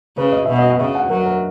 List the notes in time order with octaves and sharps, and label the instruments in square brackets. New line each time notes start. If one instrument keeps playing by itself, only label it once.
[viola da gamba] C#3 [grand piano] B4
[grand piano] D#5
[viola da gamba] B2 [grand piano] E5
[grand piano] D#5
F#5
[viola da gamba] C#3 [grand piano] E5
[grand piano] F#5
[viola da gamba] F#3 [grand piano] A#4
[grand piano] A#4